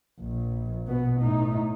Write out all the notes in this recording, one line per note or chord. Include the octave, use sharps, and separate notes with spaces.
A#1
B2 B3
A2 D#4